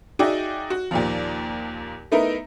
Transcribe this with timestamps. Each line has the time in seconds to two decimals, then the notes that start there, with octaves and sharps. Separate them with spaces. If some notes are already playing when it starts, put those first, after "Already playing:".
0.19 D#4 F#4 G#4 D5 E5 G5
0.70 F#4
0.91 D#2 A#2 F3
2.12 A3 B3 D#4 E4 A#4